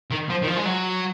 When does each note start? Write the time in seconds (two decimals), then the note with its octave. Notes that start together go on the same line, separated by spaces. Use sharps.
0.11 D#3
0.29 F3
0.42 D#3
0.48 F3
0.56 G#3
0.65 F#3